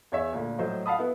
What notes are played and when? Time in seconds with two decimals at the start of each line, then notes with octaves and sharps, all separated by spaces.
0.12 E2 C#5 E5
0.33 D2 A#2
0.58 A2 F#3 C5 D#5
0.86 F5 F#5 A5 B5 D#6
0.99 B3 E4